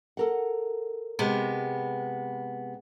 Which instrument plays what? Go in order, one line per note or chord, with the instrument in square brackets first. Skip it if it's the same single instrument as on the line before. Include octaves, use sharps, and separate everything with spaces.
[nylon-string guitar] A4 A#4 F#5
[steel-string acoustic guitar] C3 G#3 B3